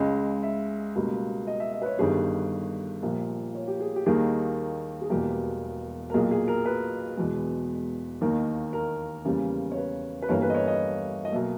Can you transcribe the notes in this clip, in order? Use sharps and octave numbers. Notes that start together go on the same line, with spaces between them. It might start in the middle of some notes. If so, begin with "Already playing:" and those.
Already playing: C#2 C#3 G#3
E5
C#2 B2 G3 A#3
D#5
E5
D#5
B4
C#5
G1 G2 D#3 G3 G#4
A#1 A#2 G3 A#3
C#5
G4
G#4
G4
D#2 D#3 G3 A#3 G#4
G#4
E1 E2 B2 G3 A#3 G4
A#4
B1 A#2 A#3 G#4
G#4
A#4
B4
E1 E2 B2 G#3
D#2 D#3 A#3
A#4
E2 C#3 G3 A#3
C#5
B4
B4
G1 G2 E3 G3 A#3 C#5
B4
D#5
C#5
D#5
D#5
B1 B2 A#3 E5